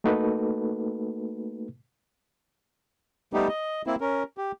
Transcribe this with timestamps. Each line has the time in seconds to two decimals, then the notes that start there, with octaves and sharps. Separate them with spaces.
0.04 A3 A#3 D#4 F#4 A4 B4
3.33 G3 A3 B3 D#4 G4
3.48 D#5
3.87 A#3 C4 E4
4.01 C#4 A#4
4.38 G4